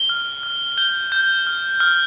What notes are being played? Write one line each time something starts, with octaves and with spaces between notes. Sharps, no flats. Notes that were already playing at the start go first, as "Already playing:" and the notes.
Already playing: G7
F6
F6
G6 G7
G6
F6
F6